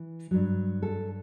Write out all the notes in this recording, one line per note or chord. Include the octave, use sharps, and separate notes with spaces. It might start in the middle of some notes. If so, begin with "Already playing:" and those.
Already playing: E3
G2 F#3
A4